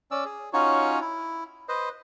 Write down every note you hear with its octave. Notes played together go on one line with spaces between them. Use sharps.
C#4 D5 E6
G#4
C#4 D#4 F4 F#4 C#5
E4
B4 C5 D#5